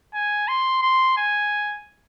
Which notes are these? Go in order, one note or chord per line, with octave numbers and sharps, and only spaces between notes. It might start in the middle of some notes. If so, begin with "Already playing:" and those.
G#5
C6
C6
G#5